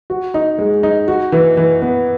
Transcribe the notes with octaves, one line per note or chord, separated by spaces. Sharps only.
F#4
D#4
G#3
D#4
F#4
E3
E3
B3